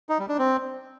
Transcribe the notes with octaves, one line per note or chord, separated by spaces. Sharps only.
D#4
G3
D4
C4